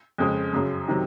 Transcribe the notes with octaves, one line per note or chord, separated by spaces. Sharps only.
F2 C#3 G#3
F#2 C#3 F#3
C3 D#3 F#3